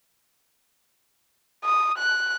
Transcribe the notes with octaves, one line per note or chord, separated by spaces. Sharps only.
D#6
F#6